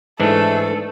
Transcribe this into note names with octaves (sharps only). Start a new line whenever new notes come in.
G#2 E3 A3 D4 A4